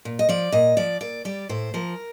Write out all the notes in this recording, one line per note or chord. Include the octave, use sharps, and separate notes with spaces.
A#2
D#5
F3 D5
A#2 D#5
F3 D5
A#2 D5
G3 D5
A2 C5
F3 A#4